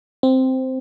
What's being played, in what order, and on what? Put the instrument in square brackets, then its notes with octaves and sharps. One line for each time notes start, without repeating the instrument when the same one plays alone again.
[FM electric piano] C4